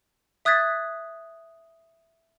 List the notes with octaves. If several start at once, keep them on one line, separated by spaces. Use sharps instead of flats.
E5 D#6 F#6 G#6 A6 B6